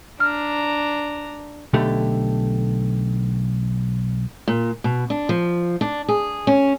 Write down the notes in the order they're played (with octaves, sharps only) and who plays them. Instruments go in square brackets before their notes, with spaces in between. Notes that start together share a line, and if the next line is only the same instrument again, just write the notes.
[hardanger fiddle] D4 A#5 [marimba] F6
[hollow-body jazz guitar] B1 D3 A3 G4
[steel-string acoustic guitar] A#2
B2
D4
F3
D4
G#4
C#4